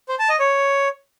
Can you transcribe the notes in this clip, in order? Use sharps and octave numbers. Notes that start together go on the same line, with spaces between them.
C5
A5
D#5
C#5